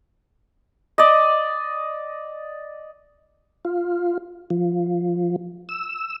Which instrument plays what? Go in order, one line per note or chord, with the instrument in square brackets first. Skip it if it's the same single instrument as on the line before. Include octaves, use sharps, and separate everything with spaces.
[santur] D5 D#5
[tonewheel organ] F4
F3
E6